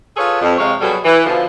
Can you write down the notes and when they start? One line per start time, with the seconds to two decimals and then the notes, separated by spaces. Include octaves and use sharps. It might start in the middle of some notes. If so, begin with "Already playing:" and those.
0.17 F4 G#4 A4 B4 C#5
0.41 F2
0.58 C3 G#3 C#5 F5
0.81 B2 F#3 G3 G#4 A4
1.05 E3
1.26 B2 D3 F3